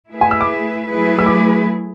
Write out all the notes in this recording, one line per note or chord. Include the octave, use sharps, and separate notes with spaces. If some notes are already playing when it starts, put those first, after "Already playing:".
A3 E4 G#4 B4 E5
G#5
E6
D6
F#3 A3 E4 G#4 B4
E6
D6